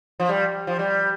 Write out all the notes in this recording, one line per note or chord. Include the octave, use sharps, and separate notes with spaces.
F3
G3
F3
G3